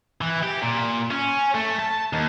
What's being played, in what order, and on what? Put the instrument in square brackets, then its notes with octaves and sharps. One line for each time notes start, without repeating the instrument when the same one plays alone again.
[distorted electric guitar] E3
G4
A#2
C#4
A3
A5
D#2